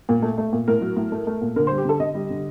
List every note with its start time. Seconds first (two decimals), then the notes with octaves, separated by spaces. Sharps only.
0.09 A#2
0.22 A3
0.38 A3
0.53 A#2
0.68 A2 A#4
0.81 F#3
0.97 A2
1.12 A3
1.27 A3
1.42 A#2
1.56 D3 A#4
1.67 G3 C5
1.78 G4
1.85 D3 A4
2.00 D3 D#5
2.14 G3
2.30 D3